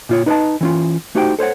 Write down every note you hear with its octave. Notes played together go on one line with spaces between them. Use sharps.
A#2 F4 C#5
D#4 B4 C#5 D#5 A5
E3 C#4 F4
A3 D#4 F#4 G4 C5 G5
A4 C5 C#5 F#5